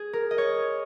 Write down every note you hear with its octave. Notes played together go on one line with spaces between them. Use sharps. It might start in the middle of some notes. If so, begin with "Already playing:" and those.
Already playing: G#4
A#4
D#5
C#5